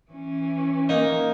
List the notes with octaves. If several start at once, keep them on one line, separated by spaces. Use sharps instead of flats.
E3 C#4
A#3 D#4